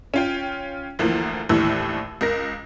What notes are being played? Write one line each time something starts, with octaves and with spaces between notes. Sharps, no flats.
C#4 F4 G5
D2 E3 F3 A#3
A#1 D#2 A2 E3 E6
C#2 A#4 A#6